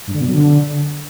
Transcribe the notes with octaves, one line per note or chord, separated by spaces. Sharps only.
G2
D3
B2
F#3
D3